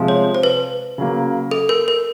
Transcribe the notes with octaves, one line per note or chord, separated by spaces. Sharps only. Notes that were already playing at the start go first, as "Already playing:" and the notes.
Already playing: C3 F3 G#3
C#5
C5
B4
C#3 F#3 A#3
A4
A#4
A#4